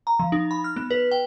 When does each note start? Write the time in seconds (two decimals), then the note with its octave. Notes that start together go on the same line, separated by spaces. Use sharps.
0.07 A#5
0.19 F3
0.32 D#4
0.51 B5
0.64 F6
0.76 B3
0.91 B4
1.12 G5